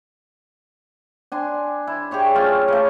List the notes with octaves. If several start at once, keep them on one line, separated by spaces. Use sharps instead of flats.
D4 G#5 C6
E4
G4 G#4 C#5 E5
A3 C#4 F4
C#3 A3